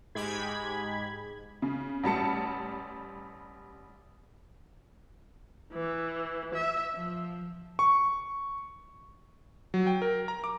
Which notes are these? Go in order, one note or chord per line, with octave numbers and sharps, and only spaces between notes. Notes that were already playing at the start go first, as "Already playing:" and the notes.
G#2 G#3 G4 B5 G#6
C#3
A1 G3 A5 C#7
E3
E5
F3
C#6
F#3
G5
A#4
A#5
D6